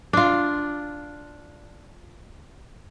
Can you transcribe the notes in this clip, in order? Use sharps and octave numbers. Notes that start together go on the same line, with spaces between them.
D4 F4